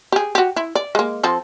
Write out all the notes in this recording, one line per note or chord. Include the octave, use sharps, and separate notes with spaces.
G4 G#4
F#4 G4
E4
D5
G#3 A#3
F3 C4 A4